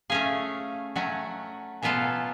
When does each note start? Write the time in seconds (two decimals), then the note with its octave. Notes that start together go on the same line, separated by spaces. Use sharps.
0.10 A3 C#4 G#4 F5
0.96 F#3 A3 C#4 F#5
1.82 B2 F#3 B3 F4 A4 G#5
2.04 G#5